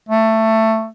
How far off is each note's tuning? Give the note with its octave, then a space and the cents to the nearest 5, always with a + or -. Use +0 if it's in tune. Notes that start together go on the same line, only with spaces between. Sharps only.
A3 +15